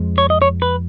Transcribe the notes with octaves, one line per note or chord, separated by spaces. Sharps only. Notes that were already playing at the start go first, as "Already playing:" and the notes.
Already playing: F2 F3 G#3
C#5
D#5
C#5
B4